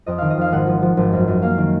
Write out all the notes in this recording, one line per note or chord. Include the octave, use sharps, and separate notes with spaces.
F2 D#5
D#3 F5
D#5
F2 F5
G#1 F#5
F3
F3
G#1
F#2
F#2
A#3 F5
D#3